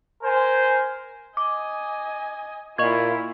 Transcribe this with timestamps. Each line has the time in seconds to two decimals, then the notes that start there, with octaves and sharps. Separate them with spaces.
0.23 A#4 C5 G#5
1.37 D#5 G#5 D6
2.78 A#2 E4 F4 D#5 C#6 G#6